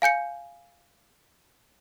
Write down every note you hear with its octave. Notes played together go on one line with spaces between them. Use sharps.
F5 G#5 G6 C#7